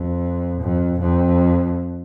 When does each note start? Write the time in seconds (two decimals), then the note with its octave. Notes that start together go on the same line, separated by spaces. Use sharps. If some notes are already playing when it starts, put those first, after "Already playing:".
Already playing: F2
0.61 F2
1.00 F2